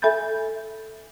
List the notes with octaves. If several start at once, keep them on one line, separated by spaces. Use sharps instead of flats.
A4 E5 G#5 B5 G6 A6